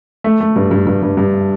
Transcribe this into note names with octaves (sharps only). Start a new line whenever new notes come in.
A3
A3
G2
G2
G2
G2
G2